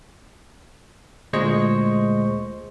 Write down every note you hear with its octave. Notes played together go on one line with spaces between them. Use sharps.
D2 A#2 G#3 C5 D#5 C#6